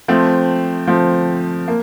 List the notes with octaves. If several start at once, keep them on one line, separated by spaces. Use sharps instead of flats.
F3 A3 C4
F3 A3 C4
A#3